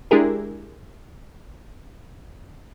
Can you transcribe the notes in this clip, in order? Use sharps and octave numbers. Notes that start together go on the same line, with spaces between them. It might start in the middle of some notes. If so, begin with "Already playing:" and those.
G#3 D4 E4 G4 G#4 A#4